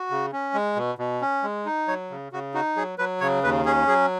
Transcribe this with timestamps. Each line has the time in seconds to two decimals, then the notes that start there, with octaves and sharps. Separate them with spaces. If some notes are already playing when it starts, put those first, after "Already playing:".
Already playing: F#4
0.11 C#3
0.32 C#4
0.54 G#3
0.76 B2
0.98 B2
1.22 C#4
1.43 G#3
1.66 D#4
1.88 F#3 C#5
2.10 C#3
2.32 C#3 F#4
2.54 D#4 F#4
2.76 F#3 G#4
2.98 F#3 B4
3.21 C#3 C#5
3.43 D#2 B4
3.65 C#4 G#4
3.87 F#3 G#4